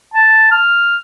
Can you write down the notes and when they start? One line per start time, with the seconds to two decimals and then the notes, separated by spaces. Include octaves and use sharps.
0.14 A5
0.51 F6